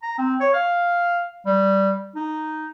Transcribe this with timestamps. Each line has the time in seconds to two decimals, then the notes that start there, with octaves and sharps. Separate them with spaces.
0.03 A#5
0.18 C4
0.40 C#5
0.54 F5
1.46 G3
2.16 D#4